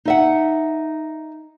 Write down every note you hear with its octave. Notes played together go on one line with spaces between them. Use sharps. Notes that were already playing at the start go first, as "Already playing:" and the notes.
D#4 E5 F#5